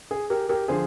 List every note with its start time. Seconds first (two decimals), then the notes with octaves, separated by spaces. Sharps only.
0.11 G#4
0.30 G4 A#4
0.49 G4 A#4
0.68 D3 F3 G#4 C5